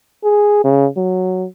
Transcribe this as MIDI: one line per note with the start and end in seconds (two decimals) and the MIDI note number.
0.24 0.63 68
0.64 0.88 49
0.97 1.47 54